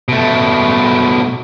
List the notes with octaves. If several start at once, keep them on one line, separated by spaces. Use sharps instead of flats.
B2 A3